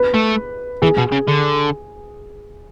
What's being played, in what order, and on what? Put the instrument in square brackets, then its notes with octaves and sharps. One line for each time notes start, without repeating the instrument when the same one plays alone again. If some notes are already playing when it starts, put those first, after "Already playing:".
Already playing: [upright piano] B4
[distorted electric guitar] A3
[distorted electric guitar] E3 [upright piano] G#4
[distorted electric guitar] B2
C#3
D3